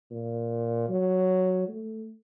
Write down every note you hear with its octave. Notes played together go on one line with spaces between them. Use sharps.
A#2
F#3
A3